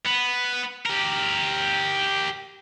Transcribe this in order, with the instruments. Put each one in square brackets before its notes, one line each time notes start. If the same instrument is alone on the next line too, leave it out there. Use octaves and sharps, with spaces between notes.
[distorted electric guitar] B3
G4 A#4